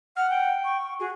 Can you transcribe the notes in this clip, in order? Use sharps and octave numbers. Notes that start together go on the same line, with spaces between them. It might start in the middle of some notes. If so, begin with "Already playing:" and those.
F#5 F6
G5
C#6
F#4 G#4